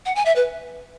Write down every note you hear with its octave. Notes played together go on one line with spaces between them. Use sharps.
F#5
G#5
E5
B4